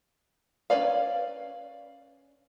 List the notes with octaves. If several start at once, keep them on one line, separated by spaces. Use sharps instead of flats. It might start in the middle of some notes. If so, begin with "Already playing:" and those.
C#4 E4 B4 D5 F5